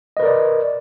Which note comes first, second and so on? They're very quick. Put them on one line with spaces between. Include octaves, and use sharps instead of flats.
D#5 B4 A#4 D5